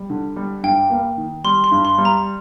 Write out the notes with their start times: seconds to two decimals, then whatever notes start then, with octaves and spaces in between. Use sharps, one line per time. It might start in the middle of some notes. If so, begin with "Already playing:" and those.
Already playing: G3
0.10 D3
0.36 G3
0.63 G2 G5
0.90 A#3
1.17 D#3
1.44 G3 C6
1.64 C6
1.71 G2
1.85 C6
1.98 G3
2.05 A#5